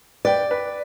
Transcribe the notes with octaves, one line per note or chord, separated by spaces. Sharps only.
B4 D5 G5
B4